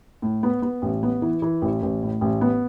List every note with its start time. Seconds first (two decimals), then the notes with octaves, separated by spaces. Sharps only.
0.22 A2
0.43 B3
0.62 B3
0.82 A1
1.03 B3
1.22 E3
1.42 E3
1.62 A1
1.82 A1
2.02 A2
2.21 A1
2.41 B3